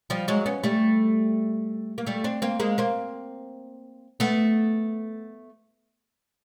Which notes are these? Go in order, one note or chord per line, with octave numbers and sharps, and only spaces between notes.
F3 G3
F#3 G#3
B3 C#4
G3 A3
A#3
G3 A3
C4 D4
A#3 C4
G#3 A#3
A#3 C4
A3 B3